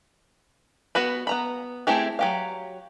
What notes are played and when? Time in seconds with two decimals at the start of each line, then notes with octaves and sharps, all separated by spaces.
0.95 B3 F#4 B4 B5
1.27 B3 A#5 B5
1.87 A3 C4 E4 G4 G#4
2.19 F#3 G4 F5